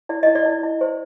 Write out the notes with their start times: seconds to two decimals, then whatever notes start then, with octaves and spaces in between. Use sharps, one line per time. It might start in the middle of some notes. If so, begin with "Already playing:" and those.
0.09 E4 D5
0.23 E4 D#5
0.35 D5
0.46 E4
0.63 E4
0.81 C5